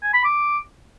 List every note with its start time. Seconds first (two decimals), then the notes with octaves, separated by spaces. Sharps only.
0.03 G#5
0.14 B5
0.24 D6